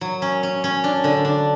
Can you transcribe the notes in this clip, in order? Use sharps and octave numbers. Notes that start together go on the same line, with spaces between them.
F#3
C#4
C#4
C#4
D4
D3
D4